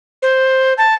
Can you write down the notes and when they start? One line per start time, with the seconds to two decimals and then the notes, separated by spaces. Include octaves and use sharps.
0.22 C5
0.78 A5